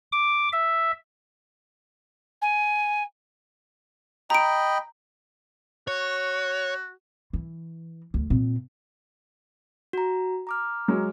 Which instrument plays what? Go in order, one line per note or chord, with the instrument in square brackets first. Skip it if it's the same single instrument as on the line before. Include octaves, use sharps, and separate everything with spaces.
[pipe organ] D6
E5
[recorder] G#5
[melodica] D#5 G5 B5 [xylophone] A#5 D7
[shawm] F#4 [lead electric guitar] C#5
[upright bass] E3
D2
A#2 C4
[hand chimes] F#4 A#5
A#5 D6 F6
[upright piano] F#3 G#3